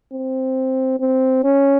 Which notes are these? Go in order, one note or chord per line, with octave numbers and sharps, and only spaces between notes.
C4
C4
C#4